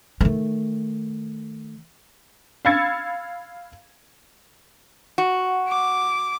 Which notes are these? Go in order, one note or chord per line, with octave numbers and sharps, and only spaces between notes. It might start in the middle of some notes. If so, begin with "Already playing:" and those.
D#3 A3
F5 B5 E6 G#6 A6 C#7
F#4
D6